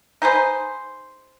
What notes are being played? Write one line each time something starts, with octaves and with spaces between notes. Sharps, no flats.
D#4 G#4 B4 C5